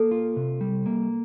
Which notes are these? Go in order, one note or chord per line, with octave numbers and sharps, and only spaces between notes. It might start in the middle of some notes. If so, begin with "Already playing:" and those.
Already playing: A#3 A4
F4
C3
G3
A#3